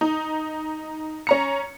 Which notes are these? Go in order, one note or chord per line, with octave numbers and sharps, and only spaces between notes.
D#4
C#4 A#5 C#7